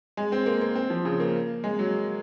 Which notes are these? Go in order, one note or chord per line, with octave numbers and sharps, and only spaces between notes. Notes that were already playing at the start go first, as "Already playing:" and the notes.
G#3
C4
A#3
A#3
C4
F3
C#3
A#3
G#3
F#3